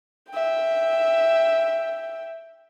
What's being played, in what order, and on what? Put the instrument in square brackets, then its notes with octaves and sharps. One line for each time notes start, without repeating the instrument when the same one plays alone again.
[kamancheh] E5 G5